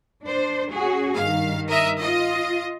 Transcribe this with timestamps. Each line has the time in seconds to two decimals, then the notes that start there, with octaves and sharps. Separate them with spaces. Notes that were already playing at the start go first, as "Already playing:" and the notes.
0.22 D4 C5
0.71 C#4 F#4 G#4
1.16 G2 D#3 F5
1.67 A#4 D#5 E5
1.99 F4 D#5